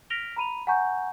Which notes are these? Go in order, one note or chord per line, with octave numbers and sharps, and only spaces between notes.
F6 A#6 B6 D7 F7 G7
A#5 B5 D#7 F7
F#5 G#5 A#5 C#6 G6